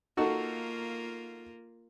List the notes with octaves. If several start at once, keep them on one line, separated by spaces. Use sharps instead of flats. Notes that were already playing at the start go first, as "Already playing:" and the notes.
A#3 D#4 F4 F#4 A4